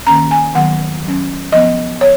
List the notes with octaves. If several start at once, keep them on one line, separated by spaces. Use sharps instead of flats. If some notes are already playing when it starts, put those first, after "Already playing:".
D#3 A#3 C#4 A#5
G#5
D#3 F#3 B3 F#5
F#3 C#4
F3 B3 D#5
C#5